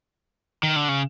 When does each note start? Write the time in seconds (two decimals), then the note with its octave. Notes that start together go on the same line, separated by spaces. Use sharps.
0.63 D#3
0.76 D3
0.89 C#3